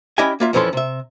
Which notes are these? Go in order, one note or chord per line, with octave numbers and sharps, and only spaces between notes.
C#4 E4 G4 D#5 E5 G#5
A#3 F4 E5
F2 E3 F3 C#4 A4 C6
C3 E5